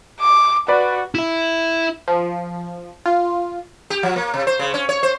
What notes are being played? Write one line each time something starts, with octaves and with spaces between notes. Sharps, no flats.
D6
F#4 B4 D5 B5
E4 E5
F3
F4
G4
F3
A#3
C3
C5
C#3
C#4
C#5
C5